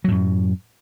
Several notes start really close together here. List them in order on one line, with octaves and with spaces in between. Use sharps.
F#3 A2 F#2